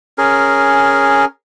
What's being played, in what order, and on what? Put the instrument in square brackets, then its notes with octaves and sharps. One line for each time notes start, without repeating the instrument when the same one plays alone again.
[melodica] C#4 G#4 A#4